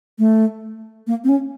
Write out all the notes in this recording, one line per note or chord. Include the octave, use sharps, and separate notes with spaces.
A3
A#3
C4
C#4